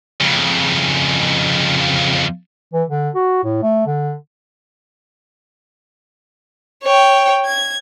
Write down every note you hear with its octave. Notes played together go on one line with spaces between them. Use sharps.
F2 C#3
E3
D3
F#4
A2
A3
D3
C#5 G5
G#6